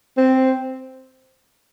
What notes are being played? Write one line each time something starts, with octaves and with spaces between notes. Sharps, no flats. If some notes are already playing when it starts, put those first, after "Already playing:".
C4